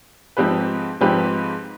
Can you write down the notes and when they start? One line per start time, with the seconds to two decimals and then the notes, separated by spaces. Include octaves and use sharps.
0.37 G#2 F3 C4 G4 B4
1.01 G#2 F3 C4 G4 B4